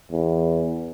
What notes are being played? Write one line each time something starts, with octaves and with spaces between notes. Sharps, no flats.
E2